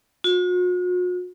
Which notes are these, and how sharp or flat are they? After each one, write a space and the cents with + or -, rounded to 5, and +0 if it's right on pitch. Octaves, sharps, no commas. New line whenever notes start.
F#4 -45